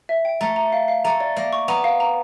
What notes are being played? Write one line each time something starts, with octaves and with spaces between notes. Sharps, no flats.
E5
G5
A3 A#5
A#5
F5
F5
A3 A#5
D5
A#3 D5
C#6
B3 A#5
F5
A#5